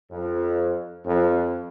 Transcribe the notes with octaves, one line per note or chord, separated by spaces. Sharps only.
F2
F2